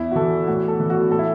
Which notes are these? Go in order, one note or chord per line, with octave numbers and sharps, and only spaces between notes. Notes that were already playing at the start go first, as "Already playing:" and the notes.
Already playing: E2 E4
F#4
E3 A4
A2 F#4
A4
E3
F#4
A2 A4
E4